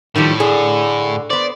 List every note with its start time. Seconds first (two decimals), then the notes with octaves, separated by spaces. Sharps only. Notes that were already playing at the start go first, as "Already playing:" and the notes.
0.15 A2 D#3 F3 G3
0.40 D3 G#4
1.30 B3 C5 D5